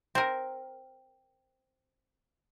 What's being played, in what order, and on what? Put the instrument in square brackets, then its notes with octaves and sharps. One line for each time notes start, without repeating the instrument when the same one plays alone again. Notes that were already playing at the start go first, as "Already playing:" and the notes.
[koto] C4 A#4